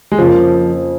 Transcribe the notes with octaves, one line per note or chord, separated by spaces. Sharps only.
G#3
F2 C#3 F3 A#3 F4